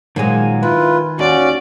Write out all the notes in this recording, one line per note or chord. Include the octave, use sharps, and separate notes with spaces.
A#2 D#3 F#3 G#3 G#5
E4 F4 B4
D#2 C#4 F#4 D5